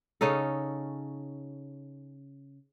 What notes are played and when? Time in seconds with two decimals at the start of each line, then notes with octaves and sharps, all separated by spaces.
0.21 C#3 C#4 D#4 A4